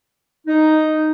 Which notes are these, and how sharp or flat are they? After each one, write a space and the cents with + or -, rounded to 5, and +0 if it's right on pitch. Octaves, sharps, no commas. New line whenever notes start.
D#4 +0